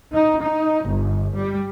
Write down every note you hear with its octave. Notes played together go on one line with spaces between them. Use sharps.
D#4
D#4
G1
G3